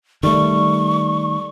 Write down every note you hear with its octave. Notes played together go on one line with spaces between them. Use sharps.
D#3 G3 A3 C#6